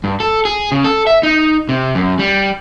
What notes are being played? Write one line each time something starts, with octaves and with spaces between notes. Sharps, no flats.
G2
A4
G#4
C#3
A4
E5
D#4
C3
F#2
G3